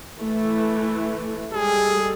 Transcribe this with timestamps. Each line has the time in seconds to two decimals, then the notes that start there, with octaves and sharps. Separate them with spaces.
0.18 E3 A3
1.53 G3 G#3 G#4 A4